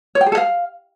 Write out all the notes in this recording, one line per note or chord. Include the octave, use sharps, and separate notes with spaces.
C#5
G5
G#4
A4
F5